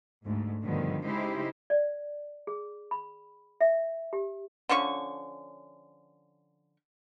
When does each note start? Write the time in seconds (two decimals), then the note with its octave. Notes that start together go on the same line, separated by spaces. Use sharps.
0.25 D2 G#2 A3
0.63 G2 B2 D3 D#3 F3 B3
1.05 C#3 G#3 D#4 E4 G4 C5
1.70 D5
2.47 G#4
2.91 B5
3.61 E5
4.13 G4
4.69 D3 F3 C#4 C#6